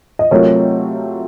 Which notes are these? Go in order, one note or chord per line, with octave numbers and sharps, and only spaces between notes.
D#5
C3 F#3 A3 C4 F4 A#4 C#5